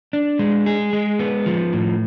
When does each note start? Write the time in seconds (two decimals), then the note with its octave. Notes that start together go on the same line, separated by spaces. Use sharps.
0.13 D4
0.39 G#3
0.66 G#4
0.93 G#3
1.19 B3
1.46 F3
1.73 A2